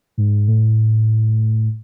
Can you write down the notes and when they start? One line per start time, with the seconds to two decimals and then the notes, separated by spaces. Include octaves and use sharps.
0.18 G#2
0.48 A2